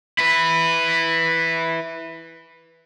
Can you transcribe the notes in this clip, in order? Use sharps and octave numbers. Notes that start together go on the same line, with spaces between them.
E4 B4